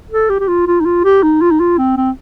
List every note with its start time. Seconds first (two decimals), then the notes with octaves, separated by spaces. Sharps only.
0.11 A4
0.29 G4
0.40 G4
0.48 F4
0.67 F4
0.80 D#4
0.85 F4
1.04 G4
1.23 D#4
1.41 F4
1.51 D#4
1.60 F4
1.78 C4
1.97 C4